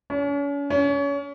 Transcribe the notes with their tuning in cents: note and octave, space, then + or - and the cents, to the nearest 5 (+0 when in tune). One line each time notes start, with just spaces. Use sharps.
C#4 +40
C#4 +30